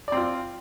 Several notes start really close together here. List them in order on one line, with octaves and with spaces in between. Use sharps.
D5 C4 F4